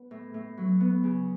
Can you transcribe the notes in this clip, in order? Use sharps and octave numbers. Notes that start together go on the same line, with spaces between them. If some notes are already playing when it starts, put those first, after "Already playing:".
Already playing: B3
A2
A2
F#3
B3
C#3